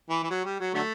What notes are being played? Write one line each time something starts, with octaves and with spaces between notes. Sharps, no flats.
E3
E3
F#3
G3
F#3
D3 F#3 A3